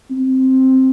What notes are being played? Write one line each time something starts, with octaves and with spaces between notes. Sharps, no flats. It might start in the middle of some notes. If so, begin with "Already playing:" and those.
C4